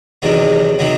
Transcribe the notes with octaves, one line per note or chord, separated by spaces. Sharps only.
E2 C3 D#3 F#3 B3
C3 D#3 F#3 B3